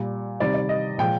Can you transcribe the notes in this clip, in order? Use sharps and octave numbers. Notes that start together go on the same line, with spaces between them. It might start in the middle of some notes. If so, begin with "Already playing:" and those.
Already playing: A#2 G3
C3 D#3 G3 D5
D5
D#5
A#2 F3 G#3 G5